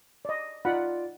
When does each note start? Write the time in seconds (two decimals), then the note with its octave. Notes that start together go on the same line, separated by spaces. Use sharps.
0.25 D5 D#5
0.65 D#4 F4 D5 F#5 B5